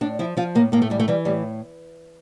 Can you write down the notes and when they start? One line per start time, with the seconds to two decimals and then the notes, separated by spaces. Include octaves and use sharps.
0.01 A2 D4
0.19 F3 E4
0.37 F3 F4
0.55 A2 A#3
0.72 A2 A#3
0.82 A3
0.90 E3 G3
1.00 A3
1.08 E3 G3
1.25 A2 G3